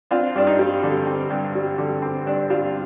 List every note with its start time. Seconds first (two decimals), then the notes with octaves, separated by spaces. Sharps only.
0.11 C4 D4 F4
0.36 G2 D4
0.47 D#4
0.59 G3
0.83 D3
1.07 C4
1.30 G2
1.55 G3
1.78 D3
2.02 C4
2.26 G2 D4
2.50 G3 D4 F4